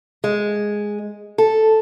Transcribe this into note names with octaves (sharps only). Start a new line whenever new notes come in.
G#3
A4